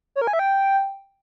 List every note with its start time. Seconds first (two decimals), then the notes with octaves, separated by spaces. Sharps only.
0.16 C#5
0.21 A#4
0.27 G#5
0.33 E5
0.39 G5